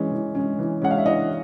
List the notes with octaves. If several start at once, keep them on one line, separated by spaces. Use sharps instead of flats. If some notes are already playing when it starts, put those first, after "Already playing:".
Already playing: E3 G#3 C#4
E3
G#3 C#4
E3
G#3 C#4 F#5
F5
E5
E3 D#5